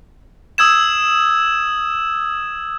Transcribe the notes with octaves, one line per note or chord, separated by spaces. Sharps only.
D#6 E6 G#6 E7